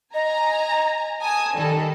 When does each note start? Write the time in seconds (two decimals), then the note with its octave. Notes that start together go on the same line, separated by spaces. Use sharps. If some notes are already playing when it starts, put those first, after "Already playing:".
0.14 D#5 G#5 A#5
1.21 G#5 A5 D#6
1.56 D#3 G3 A4